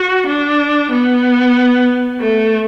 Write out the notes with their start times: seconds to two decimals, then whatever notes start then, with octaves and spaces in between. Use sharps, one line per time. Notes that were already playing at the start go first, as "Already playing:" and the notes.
Already playing: F#4
0.27 D4
0.92 B3
2.21 A3